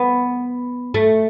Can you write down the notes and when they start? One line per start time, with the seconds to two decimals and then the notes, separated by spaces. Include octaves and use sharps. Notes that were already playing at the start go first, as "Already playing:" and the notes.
Already playing: B3
0.94 A3